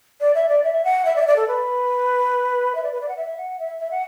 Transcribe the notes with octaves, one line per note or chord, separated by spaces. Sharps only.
D5
E5
D5
E5
F#5
E5
D5
E5
D5
A4
B4
E5
D5
B4
D5
F#5
E5
F#5
E5
E5
F#5